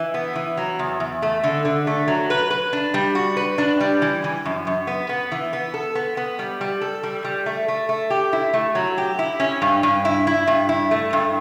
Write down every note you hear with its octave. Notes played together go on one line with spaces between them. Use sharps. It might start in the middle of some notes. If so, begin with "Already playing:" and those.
Already playing: E3
B3
E3
F#3
E2
E2
A3
D3
D3
A3
F#3
B4
B4
D4
G3
F#4
B4
D4
G3
E3
E3
F#2
F#2
B3
B3
E3
B3
A4
B3
B3
G3
G3
A4
G3
G3
A3
A3
A3
G4
E4
A3
F#3
G4
E4
C#4
G2
G2
E4
E4
G2
E4
A3
G2